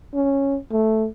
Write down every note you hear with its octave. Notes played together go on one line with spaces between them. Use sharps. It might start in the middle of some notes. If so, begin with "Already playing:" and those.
C#4
A3